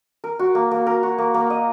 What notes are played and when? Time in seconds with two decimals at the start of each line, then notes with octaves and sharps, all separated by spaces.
0.24 A#4
0.39 F#4
0.55 A#3
0.71 A#3
0.87 A#4
1.03 F#4
1.18 A#3
1.34 A#3
1.50 D#5